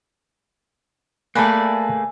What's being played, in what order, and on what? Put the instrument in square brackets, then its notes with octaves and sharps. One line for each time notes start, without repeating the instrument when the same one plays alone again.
[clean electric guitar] A3 A#3 [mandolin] G#4 B4 D5 [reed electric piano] A5 B5 F#6